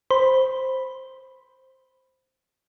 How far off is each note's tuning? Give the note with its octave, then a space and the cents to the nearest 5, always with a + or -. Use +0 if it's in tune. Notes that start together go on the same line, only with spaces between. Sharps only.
C5 +0 B5 +0